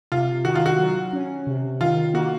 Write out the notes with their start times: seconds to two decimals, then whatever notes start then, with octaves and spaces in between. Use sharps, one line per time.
0.12 C3 F4
0.45 D#3 F#4
0.55 F4
0.66 F#4
0.79 F#3
1.13 C#4
1.47 C3
1.81 D#3 F4
2.14 A#3 F#4